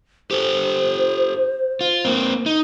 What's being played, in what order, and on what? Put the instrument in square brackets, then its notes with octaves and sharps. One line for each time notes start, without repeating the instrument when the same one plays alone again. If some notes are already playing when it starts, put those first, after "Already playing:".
[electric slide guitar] G4 A4 [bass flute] C5
[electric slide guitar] F4
A#3 C4
D#4